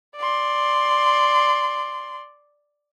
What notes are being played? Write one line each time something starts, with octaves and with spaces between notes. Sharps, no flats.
D5 C6